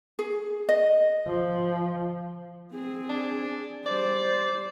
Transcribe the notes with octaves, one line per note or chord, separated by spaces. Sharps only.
G#4
D#5
F3
C4 G#4
D4
G3 C5 D5